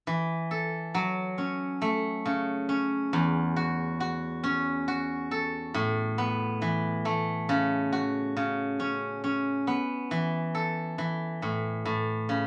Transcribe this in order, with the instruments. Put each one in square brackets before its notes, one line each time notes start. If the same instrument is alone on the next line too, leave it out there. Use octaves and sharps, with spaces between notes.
[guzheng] E3
A4
F#3
C#4
A3
C#3
C#4
E2
F#4
F#4
C#4
F#4
A4
A2
B3
E3
A3
C#3
F#4
C#3
C#4
C#4
B3
E3
A4
E3
A2
A2
C#3